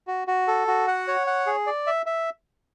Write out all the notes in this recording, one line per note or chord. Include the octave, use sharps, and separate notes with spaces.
F#4
F#4
A4
F#4
F#5
C#5
F#5
G#4
D5
E5
E5